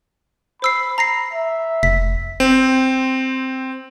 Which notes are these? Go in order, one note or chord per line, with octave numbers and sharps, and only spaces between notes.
C5 B5 E6 C7
A#5 A#6 C7
E5
F1 B6
C4